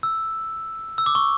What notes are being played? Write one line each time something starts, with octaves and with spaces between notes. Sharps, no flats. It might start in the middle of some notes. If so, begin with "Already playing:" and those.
E6
E6
D6
C#6